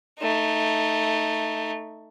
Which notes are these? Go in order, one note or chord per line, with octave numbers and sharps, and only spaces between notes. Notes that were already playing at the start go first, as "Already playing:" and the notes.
A3 D#4